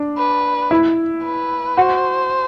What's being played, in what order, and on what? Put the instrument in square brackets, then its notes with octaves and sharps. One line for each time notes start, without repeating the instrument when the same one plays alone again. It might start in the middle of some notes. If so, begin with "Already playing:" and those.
Already playing: [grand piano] D4
[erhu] B4
[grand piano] E4
[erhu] B4
[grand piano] F#4 [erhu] C5